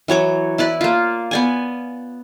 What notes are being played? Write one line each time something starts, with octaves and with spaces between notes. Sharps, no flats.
E3 F#3 C#5 D6
E4 B4 D5
A#3 F4
B3 D5 G#5